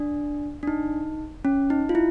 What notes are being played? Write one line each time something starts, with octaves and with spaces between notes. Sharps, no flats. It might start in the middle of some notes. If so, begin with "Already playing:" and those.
Already playing: D4
D4
D#4
C#4
D#4
F4
E4